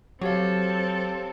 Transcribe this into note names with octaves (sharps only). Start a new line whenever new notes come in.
F#3 C4 G4 A4 C#5 F5